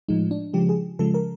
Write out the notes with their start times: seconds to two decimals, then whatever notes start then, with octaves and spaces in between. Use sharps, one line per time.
0.08 A2 F3 G#3 D#4
0.31 D4
0.53 C#3 F3 G#3 G4
0.69 G#4
0.99 C#3 F3 G#3 A4
1.14 A#4